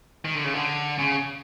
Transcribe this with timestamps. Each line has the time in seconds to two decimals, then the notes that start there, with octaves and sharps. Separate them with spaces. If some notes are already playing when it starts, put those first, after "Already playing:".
0.25 D#3
0.35 D3
0.44 C#3
0.54 D3
0.99 C#3